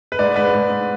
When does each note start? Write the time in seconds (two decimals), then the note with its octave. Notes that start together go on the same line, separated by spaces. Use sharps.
0.12 B4
0.19 G#2 D5
0.36 G#2 B4
0.54 G#2
0.70 G#2